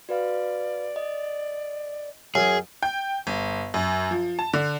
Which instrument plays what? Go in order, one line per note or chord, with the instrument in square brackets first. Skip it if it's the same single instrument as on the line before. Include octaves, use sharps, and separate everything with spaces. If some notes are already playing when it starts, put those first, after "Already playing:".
[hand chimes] F#4 B4 F5 [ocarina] D5
[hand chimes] D#5
[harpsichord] F#2 [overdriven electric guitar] G#4
[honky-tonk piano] G5
G1
F#2
F3
A5
D3